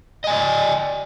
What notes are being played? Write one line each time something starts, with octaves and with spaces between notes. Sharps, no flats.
D5 D#5 G#5